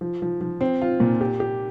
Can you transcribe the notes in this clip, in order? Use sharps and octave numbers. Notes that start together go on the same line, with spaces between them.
F3
F3
F3
C4
F4
A#2
G4
G4